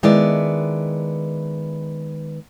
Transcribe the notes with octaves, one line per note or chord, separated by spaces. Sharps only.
D#3 G#3 B3 E4 B4 D5